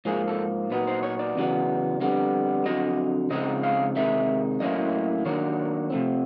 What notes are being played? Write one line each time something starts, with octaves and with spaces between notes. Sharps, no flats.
G#2 F3 A#3 G#4
A4
A#2 F#3 B3 D#4 B4
C5
C#5
D5
E2 C#3 F#3 B3
F2 D3 G3 B3
F2 D3 F#3 D#5
C#3 F3 G#3 C4 D#4 D#5
F5
C3 D#3 G#3 E5
A2 F#3 A#3 C#4 E4 D#5
D#3 F#3 A#3 D4 C#5
C3 F3 A3 C4